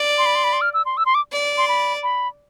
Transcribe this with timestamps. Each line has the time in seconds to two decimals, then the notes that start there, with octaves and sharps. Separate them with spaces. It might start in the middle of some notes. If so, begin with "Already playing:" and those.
Already playing: D5
0.18 C6
0.26 B5
0.35 C6
0.44 B5
0.53 C6
0.61 F6
0.74 E6
0.86 C6
0.97 E6
1.06 C6
1.15 D6
1.32 D5
1.58 C6
1.68 B5
2.03 B5